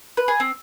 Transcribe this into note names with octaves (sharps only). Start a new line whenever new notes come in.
B4
G#4
C4